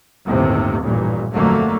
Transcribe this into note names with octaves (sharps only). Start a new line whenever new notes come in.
G1 D#2 A2 C3
A1 G2 A#2
G1 F2 D3 F#3 A3 A#3